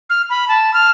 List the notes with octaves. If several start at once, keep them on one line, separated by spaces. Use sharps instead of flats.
F6
B5
A5
F6